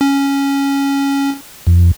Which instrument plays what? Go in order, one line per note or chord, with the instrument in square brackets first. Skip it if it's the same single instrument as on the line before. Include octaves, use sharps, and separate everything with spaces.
[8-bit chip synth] C#4
[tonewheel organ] F2